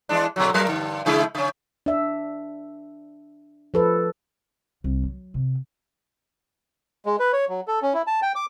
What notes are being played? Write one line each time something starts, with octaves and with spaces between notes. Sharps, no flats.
E3 G#3 D4
B2 D3 F#3
G2 F#3 A#4
G2 D3
C#3 G#3 E4
C#3 C#4
D4 E5
F3 A4 B4
C2
F#3
C3
G#3
B4
C#5
F#3
A4
C#4
E4
A5
G5
D6